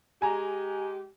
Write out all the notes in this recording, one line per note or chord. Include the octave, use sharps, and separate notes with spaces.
G#3 G4 G#5 A#5